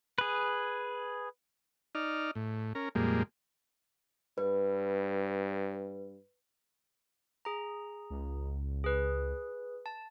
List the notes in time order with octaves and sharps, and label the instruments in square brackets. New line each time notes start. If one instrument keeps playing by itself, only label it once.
[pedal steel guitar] G#4 B4
[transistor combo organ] D#4 D5 F6
A2
C#4 A#4
F2 A#2 G3 G#3 A#3
[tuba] G2 [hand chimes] B4
[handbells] G#4 A#5
[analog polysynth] C#2
[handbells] G#4 B4
A5